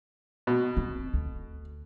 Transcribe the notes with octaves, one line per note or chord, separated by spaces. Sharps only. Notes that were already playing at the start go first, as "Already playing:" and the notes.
B2
C4
D2